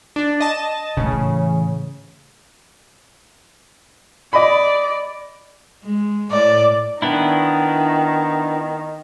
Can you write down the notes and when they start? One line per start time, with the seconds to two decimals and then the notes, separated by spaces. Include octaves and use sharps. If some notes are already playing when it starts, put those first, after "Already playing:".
0.16 D4
0.40 D#5 A5
0.97 A2 C#3 E3
4.33 D5 D#5 B5
5.84 G#3
6.32 A2 D5
7.02 D#3 B3 D4 E4